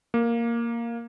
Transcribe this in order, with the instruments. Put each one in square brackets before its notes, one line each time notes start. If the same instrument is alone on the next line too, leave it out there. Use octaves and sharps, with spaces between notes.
[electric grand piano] A#3